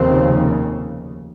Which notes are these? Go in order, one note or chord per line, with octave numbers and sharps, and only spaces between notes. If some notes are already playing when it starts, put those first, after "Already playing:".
Already playing: F1 D#2 C#3 C4